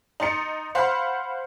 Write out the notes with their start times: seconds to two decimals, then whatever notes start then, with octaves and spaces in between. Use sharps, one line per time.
0.20 D#4 C6 A6 C#7
0.75 C5 F5 F#5 B5 C6